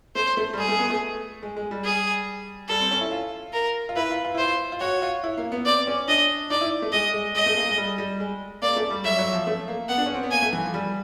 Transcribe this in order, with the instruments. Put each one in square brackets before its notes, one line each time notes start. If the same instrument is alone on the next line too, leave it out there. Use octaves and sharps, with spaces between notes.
[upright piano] A3 [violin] C5
[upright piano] A3
G3
[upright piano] G#3 [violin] G#4
[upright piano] A3
B3
A3
G#3
G#3
G3
[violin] G#4
[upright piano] G3 [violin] A4
[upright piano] C4
C#4
E4
F4
[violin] A#4
[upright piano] F4
[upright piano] E4 [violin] B4
[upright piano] F4
F4
[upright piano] E4 [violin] C5
[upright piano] F4
F4
[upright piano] F#4 [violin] C#5
[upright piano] F4
E4
A#3
B3
[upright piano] C4 [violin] D5
[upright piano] C#4
[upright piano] D4 [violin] D#5
[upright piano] D#4 [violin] D5
[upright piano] E4
A3
[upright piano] G#3 [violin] D#5
[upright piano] G#3
[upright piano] G#3 [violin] D#5
[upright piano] A3
A#3
G#3
G3
G3
G#3
[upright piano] A#3 [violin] D5
[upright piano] A3
G3
[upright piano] F#3 [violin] E5
[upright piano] F#3
F3
A3
A#3
[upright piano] B3 [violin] F#5
[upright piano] D4
C#4
C4
B3
[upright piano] A#3 [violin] G#5
[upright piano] A3
E3
F3
G3